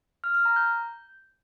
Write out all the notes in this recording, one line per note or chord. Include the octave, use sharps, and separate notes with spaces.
F6
F6
A#5
G6